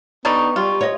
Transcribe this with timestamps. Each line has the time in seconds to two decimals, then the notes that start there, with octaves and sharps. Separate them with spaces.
0.25 D3 G3 B3 D#4 C#6
0.56 G3 F4
0.81 C#5 D#5